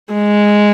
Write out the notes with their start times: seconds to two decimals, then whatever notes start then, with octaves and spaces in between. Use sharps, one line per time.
0.13 G#3